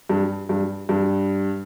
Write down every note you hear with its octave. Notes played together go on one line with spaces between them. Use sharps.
G2
G2
G2